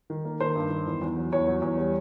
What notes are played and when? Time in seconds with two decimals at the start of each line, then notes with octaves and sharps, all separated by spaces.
0.10 D#3
0.25 A#3
0.41 D#3 C5
0.56 G2
0.70 D#3
0.86 E2
1.01 E2
1.17 F#3
1.32 E2 C#5
1.47 F#3
1.62 E2
1.77 G3